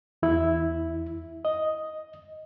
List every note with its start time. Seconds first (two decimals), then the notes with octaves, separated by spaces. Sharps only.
0.23 E2 E4
1.45 D#5